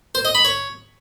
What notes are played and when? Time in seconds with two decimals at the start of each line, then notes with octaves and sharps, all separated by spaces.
0.15 C5
0.25 D#5
0.35 B5
0.45 C#5